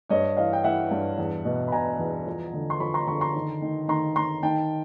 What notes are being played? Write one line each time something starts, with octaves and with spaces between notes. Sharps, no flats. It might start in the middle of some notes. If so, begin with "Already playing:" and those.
G2 C#5 D#5
E3 D#5 F5
G5
E3 E5 F#5
G2
E2
B2
B5
B2 G#5 A#5
E2
F3
D3
C6
F3 B5 C#6
A#5 C6
D3 B5 C#6
A#5 C6
D#3
D#3
D#3 A#5 C6
D#3 A#5 C6
D#3 G5 A5